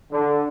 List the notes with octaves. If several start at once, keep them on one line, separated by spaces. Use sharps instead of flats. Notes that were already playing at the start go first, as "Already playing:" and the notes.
D3